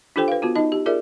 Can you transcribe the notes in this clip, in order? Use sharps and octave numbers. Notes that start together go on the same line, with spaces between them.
D4 F4 G4 A4 C5 G5
B4 F5
B3 F4 F#4
D#4 D#5 A5
G4
F4 G#4 A#4 D5 E5